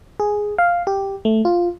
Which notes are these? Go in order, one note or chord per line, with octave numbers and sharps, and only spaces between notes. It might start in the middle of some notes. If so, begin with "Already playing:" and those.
G#4
F5
G4
A3
F4